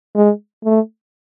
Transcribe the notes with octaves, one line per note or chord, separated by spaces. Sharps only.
G#3
A3